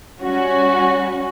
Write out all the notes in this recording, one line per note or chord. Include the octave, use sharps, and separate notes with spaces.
G3 C#4 F#4